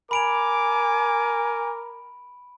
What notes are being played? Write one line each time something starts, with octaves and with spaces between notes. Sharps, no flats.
A#4 G#5 B5 D6 D7 F7